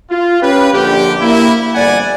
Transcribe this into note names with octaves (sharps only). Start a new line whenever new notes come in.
F4
C#4 G4 B4
A#1 D3 G4
A#3 E4
G1 F2 D5 F#5 G#5